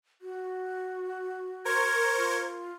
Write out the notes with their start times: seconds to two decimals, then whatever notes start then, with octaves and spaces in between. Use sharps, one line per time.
0.22 F#4
1.65 A#4 C5 C#6 G#6
2.18 F4